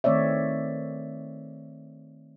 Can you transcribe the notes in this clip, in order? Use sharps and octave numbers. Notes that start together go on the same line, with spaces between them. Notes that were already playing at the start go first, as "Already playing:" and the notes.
D#3 A3 C4 C#5 D5 E5